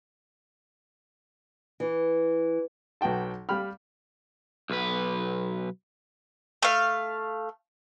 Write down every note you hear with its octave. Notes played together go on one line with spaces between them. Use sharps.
E3
B1 B3 F#4 G5 A5
G3 F5 G5 B5 F6
B1 B4
A3 F5